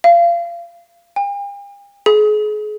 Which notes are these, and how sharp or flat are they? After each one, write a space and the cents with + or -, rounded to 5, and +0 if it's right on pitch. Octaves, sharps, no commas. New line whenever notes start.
F5 -30
G5 +45
G#4 +35